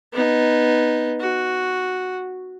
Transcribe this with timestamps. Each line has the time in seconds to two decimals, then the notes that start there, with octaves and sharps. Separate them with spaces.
0.13 B3 D#4
1.20 F#4